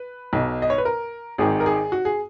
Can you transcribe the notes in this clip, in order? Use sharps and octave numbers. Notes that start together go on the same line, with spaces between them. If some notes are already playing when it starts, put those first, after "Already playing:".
Already playing: B4
B1 B2
D#5
C#5
B4
A#4
G#1 G#2 D#3 G#4
A#4
G#4
F#4
G#4